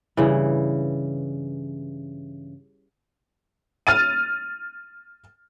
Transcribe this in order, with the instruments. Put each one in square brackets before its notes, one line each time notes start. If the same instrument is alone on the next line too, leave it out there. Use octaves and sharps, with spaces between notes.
[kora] G2 C#3 E3
[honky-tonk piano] F6 A6 D#7